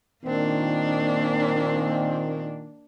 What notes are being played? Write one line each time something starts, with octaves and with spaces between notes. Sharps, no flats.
A#2 D#3 A#3 C4 D4